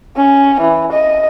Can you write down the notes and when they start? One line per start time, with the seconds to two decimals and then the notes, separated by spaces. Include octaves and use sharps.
0.17 C#4
0.61 E3
0.92 D#5